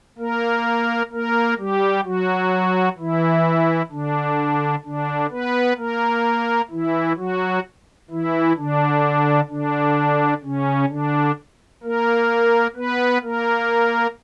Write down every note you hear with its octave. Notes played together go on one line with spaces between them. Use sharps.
A#3 A#4
A#3 A#4
G3 G4
F#3 F#4
E3 E4
D3 D4
D3 D4
B3 B4
A#3 A#4
E3 E4
F#3 F#4
E3 E4
D3 D4
D3 D4
C#3 C#4
D3 D4
A#3 A#4
B3 B4
A#3 A#4